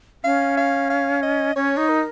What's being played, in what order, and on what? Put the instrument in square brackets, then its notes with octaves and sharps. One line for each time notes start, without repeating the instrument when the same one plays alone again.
[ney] C#4 [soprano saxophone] F5
[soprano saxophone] F5
F5
D#5
[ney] C#4 [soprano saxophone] C#5
[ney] D#4
[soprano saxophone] A#4